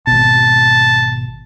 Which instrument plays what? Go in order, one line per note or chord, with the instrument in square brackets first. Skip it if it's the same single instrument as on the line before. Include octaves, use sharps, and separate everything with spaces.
[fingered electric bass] G#1 B2 [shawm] A5